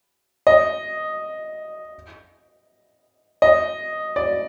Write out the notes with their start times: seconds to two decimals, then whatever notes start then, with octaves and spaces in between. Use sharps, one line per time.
0.47 D#5
3.42 D#5
4.16 D5